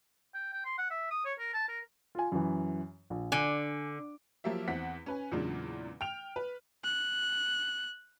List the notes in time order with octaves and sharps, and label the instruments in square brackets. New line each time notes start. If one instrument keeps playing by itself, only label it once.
[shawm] G5
G5
C6
F#5
E5
D#6
C#5
A#4
A5
A#4
[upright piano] F4 G#5
F#2 E3
A#1
[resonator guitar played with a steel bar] D3 [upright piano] G#5
[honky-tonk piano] F3 F#3 A#3 G4 E5
E2 C4 F#5 B6
C#4 B4 G#5
E2 A#2 C#3 F#3 G#3 D4
G5 F6 F7
B4
[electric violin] F#6